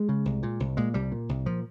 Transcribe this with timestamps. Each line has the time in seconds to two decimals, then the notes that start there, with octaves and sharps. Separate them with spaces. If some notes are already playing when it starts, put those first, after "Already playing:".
Already playing: G#3
0.09 C#3
0.25 C2
0.43 A#2
0.60 C2
0.77 A#2 G#3
0.94 C2 G3
1.12 A#2
1.29 C2
1.46 A#2 F3